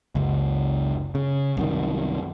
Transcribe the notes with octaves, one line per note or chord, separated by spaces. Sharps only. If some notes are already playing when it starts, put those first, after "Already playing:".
F#1 C#2
C#3
C2 F#2 D#3